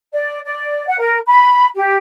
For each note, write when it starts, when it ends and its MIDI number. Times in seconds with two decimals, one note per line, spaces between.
0.13 0.39 74
0.44 0.84 74
0.87 0.97 78
0.99 1.18 70
1.27 1.65 83
1.75 1.95 67